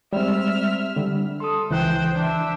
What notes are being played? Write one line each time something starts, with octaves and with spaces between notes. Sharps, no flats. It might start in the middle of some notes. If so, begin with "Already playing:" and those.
G3 G#3 C4 E5 F6
D3 G3
A4 C6 D#6
C#2 E3 C5 G5 F#6
D4 E5